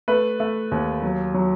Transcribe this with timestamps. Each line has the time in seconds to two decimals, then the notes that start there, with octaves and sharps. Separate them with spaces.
0.08 A3 B4
0.40 A3
0.72 D#2
1.02 F#3
1.34 F#3